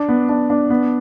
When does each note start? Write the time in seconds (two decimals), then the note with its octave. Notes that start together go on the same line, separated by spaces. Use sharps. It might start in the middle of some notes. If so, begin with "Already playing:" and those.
Already playing: D4
0.09 B3
0.29 D4
0.50 D4
0.70 B3